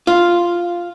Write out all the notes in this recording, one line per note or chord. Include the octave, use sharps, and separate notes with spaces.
F4